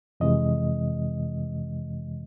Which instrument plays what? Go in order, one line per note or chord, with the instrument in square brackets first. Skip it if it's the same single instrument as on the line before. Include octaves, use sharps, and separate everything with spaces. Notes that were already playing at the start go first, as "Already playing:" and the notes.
[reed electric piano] F2 C3 E3 G#3 D#5